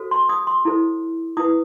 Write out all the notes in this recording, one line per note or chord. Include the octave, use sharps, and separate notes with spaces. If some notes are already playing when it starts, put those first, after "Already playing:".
Already playing: F#4 A4 C5
C6
D#6
C6
E4 A4 C5
E4 B4 D#6